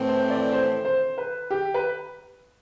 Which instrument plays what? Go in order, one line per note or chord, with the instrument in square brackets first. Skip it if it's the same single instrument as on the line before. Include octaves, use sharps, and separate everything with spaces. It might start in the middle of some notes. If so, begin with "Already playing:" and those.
Already playing: [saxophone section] A2 E3 A3 C4
[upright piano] C5
D5
C5
C5
B4
G4
B4